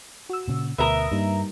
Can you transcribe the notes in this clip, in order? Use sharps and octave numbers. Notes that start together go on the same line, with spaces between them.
F#4 E6
A#2 C#3
D2 B2 A#4 B4 E5 D#6
G2 G3 A#3 D#4